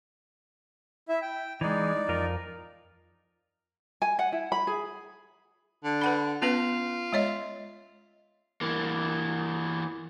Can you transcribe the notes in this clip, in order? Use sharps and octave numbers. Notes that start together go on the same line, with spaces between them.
E4 E5
G5
E3 G#3 D#4 D5
F2 F4 A#4
G#5
F#5
E4
B5
G#4
D3
B4 F#5 B5
B3 C#4 F4 B4
G#3 C#5 D#5
E3 A#3